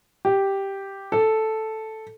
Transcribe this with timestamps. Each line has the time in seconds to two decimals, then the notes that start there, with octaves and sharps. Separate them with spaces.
0.25 G4
1.12 A4